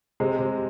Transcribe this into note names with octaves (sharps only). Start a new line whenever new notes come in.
C3 G#3
C3